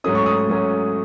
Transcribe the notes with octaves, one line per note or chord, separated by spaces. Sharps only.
G#2 F#3 A3 C#4 D#6
C#6
D#6
G#2 F#3 A3 C#4